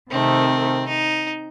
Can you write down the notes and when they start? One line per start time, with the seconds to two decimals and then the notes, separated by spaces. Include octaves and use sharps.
0.11 C3 D#3 A3 C4
0.88 D#4